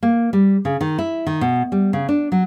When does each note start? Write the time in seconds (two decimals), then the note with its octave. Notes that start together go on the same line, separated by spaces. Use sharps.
0.03 A#3
0.33 G3
0.65 C#3
0.81 D#3
0.98 E4
1.27 D#3
1.41 B2
1.72 G3
1.93 C#3
2.09 D4
2.32 F#3